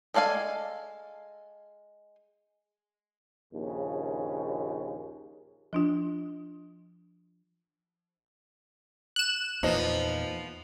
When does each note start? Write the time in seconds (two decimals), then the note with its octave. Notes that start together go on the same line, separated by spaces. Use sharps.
0.14 G#3 A4 D5 F5 G#5
3.54 A#1 D#2 C#3
5.73 F3 D4 F4
9.16 F#6 E7
9.63 E2 A#2 F3 B3 D#4 D#5